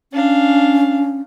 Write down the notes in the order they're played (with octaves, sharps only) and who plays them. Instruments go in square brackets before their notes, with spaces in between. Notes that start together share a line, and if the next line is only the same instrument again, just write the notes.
[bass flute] C#4 [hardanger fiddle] D4 F5